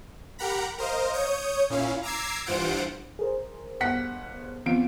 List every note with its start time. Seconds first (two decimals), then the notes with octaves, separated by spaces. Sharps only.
0.39 G4 A#4 F#5 A#5 B5
0.78 A#4 C5 D#5 F5
1.13 C#5 D#6 G6 C#7
1.70 A#2 C#4 E4 F5
2.03 A#5 D6 E6 G#6 C7
2.46 G2 E3 F4 C5 F#5 D7
3.19 G#4 A#4 C5
3.80 G1 F#5 B6
4.66 E2 C4 F4 D7